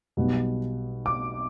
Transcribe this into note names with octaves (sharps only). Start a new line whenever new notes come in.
B1 B2 G3 B3
D6